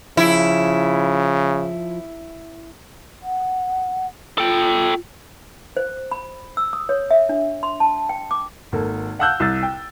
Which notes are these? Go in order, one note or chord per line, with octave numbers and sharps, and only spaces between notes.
C#3 F3 E4
F#5
F4 A4 G5
C5
B5
E6
D#6
C#5
E5
D4
C6
A5
G5
D6
G#1 A#3 A4
F5 F#5 A5 E6 F#6 G6
C2 E6 A6
G5